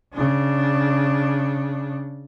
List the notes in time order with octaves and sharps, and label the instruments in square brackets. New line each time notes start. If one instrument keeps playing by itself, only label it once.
[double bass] C#3 D4